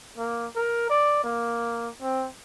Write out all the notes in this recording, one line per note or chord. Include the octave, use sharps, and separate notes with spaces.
A#3
A#4
D5
A#3
C4